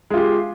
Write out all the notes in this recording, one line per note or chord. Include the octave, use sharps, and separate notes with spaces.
G#3 F4 G4